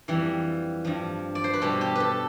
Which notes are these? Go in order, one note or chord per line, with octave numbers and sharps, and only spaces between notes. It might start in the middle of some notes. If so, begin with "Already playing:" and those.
F2 E3 G3
G2 F3
D5
C5
B4
B2 G3 A4
G4
A4 B4